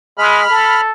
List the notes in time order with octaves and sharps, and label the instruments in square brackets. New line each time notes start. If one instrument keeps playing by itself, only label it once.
[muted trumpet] G#3 [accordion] B5 F6
[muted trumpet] A4